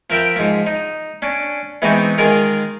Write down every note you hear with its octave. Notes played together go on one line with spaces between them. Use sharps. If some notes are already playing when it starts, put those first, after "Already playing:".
F3 A#4 E5 G5 B5
G#2 F3
D#4
C#4 D4
E3 G#3 B3 C4 D#4 F#4
D#3 G#3 F4 G#4 A#4